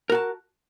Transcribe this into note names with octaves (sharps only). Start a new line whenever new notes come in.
F#4 A#4 A5